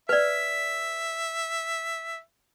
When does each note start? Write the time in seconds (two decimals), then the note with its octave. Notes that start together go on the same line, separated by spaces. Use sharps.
0.09 B4 D5 E5